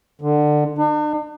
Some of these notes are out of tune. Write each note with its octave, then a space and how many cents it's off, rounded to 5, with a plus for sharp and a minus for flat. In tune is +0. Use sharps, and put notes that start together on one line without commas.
D3 +20
D4 +45